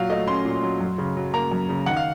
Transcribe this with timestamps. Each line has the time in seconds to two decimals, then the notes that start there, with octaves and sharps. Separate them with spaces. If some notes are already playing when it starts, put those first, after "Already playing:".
Already playing: A#2 F#3 F5
0.10 A3 D#5
0.27 C#4 C6
0.45 A#2
0.63 F#3
0.80 F#2
0.98 C#3
1.16 F#3
1.34 A#3 A#5
1.51 F#2
1.69 C#3
1.86 D#3 F#5
1.97 F5